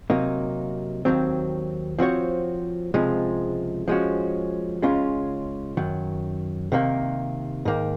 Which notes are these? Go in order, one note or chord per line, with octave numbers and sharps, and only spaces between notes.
C3 F#3 A#3 D#4
D#2 D#3 F#3 C4
F3 C4 F#4 C#5
C#2 C3 F3 G#3
F3 G#3 C#4 F#4
C#2 C#3 G#3 C#4 F4
F#2 D#3 F#3
C3 D#3 A#3
G#2 D#3 A#3